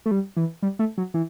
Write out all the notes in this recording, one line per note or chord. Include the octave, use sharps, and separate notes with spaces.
A3
G3
E3
G3
A3
F#3
E3